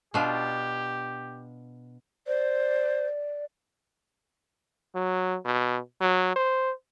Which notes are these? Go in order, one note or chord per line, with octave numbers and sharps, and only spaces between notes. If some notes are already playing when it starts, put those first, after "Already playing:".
B2 D4 F4 G4
C5 D5
F#3
B2
F#3
C5